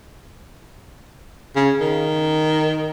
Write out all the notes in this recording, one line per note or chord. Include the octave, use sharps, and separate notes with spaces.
C#3
D#3